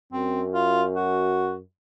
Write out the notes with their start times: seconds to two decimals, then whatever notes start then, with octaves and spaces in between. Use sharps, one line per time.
0.13 F#2 C4
0.54 F4
0.96 F#4